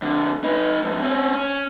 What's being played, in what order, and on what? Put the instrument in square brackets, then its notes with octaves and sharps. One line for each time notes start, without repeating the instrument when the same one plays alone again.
[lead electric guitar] F2 D3
D#4 B4
F2 G#2
C4 C#4
C#4